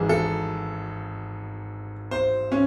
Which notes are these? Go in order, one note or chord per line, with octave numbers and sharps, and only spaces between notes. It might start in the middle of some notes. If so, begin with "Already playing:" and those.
Already playing: G#1 G#2 E3 G#4
A4
C5
C#4